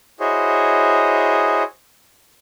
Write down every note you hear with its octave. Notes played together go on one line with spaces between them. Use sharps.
E4 F#4 G#4 C5 C#5 D#5